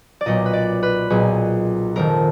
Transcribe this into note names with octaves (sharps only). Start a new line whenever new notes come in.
D5
B1 A#2 D#5
B4
D5
B4
B1 A#2 G#4
F1 F2 D#3 A#4